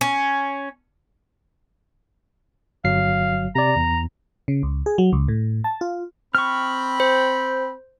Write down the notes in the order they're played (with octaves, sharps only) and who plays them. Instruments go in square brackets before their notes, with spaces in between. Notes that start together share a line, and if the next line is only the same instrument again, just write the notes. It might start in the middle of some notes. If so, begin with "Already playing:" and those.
[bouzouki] C#4
[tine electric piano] G1 F#3 C7 [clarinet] F5
[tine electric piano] C3 D5 [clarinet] A#5
[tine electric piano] E2
[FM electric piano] C#3
C#2
G#4
F#3
C#2
A2
A5
F4
[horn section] C4 B5 [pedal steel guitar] C#6 F6
[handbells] C5